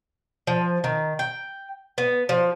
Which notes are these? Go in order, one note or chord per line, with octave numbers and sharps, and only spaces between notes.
F3
D#3
G5
B3
F3